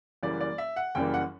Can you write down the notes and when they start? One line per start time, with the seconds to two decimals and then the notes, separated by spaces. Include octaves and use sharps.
0.23 F#1 F#2 E3 G3 A#3 D5
0.41 D5
0.58 E5
0.76 F#5
0.95 F#1 F#2 E3 G3 A#3 G5
1.14 F#5